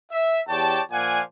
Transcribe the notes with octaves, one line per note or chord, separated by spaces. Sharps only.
E5
E2 G4 C#5 D5 G5 A5
A#2 F3 D5 F5 F#5 G#5